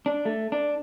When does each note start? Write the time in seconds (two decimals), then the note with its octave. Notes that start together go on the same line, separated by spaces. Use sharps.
0.06 D4
0.25 A3
0.52 D4